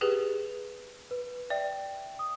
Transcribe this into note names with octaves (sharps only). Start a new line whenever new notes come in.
G4 G#4 B4
B4
D5 E5 G5
D#6